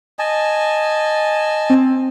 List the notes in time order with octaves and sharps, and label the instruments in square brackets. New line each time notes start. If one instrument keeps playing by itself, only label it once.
[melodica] D#5 G#5 A5
[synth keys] C4